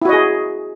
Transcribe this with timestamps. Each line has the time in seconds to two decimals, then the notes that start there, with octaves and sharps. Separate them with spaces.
0.02 E4
0.05 F#4
0.09 D#5
0.13 G#4